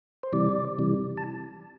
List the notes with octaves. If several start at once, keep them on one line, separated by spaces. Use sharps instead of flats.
C5
C3 E3 G3 D5
C3 E3 G3
A5